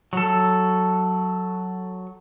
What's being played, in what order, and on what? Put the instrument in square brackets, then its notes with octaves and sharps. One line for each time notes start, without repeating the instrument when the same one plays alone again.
[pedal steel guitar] F#3 A4